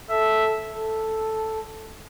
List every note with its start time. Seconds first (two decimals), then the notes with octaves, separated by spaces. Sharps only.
0.10 A4 E5
0.73 A4